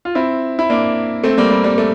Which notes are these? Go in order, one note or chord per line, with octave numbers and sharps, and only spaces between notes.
F4
C4 E4
E4
A#3 D4
A3 C4
G3 A#3
G3
G3
A3